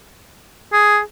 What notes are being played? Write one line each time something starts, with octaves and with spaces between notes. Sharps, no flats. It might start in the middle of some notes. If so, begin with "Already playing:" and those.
G#4